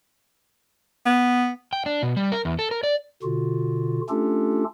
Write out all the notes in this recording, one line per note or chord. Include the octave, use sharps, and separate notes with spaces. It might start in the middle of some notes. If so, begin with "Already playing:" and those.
B3
G5
D4
B2
G3
A#4
E2
A4
A#4
D5
B2 D3 F4 F#4
A3 C#4 D4 F4 G4 A4